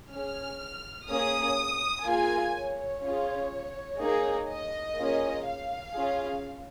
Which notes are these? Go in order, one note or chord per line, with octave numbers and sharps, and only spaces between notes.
C#4 G#4 F6
A#3 C#4 G#4 D#6
A#3 F4 G#4 G#5
C#5
C#4 F4 G#4
A#3 D#4 G#4
D#5
A#3 C#4 F4 G#4
F5
C#4 F4 G#4